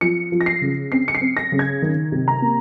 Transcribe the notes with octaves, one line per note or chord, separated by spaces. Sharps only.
F3 C#7
F3
A#6
C7
C#3
C4 C7
C#7
C7
C4
A#6
C#3
G#6
D#3
C3
A#5
A#3